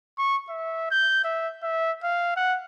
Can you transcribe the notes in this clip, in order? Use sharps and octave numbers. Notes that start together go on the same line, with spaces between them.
C#6
E5
G6
E5
E5
F5
F#5